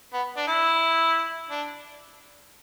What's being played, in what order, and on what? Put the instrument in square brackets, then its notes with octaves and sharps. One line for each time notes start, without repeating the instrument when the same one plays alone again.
[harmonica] B3
D4
E4
D4